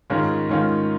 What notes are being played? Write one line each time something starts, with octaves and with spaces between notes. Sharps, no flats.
G#2 D#3 G#3 C#4 F4
G#2 D#3 G#3 C#4 F4